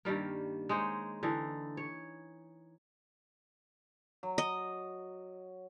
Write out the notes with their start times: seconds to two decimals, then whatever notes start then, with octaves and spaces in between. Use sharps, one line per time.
0.05 G2 D#3 G3 A#3
0.69 G#3 D#4 C5 C#5
1.23 D3 E3 D#4
1.77 C#5
4.23 F#3
4.38 D#5